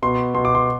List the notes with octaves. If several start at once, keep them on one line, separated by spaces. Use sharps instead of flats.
B2 C6
B2 C6
D6
C6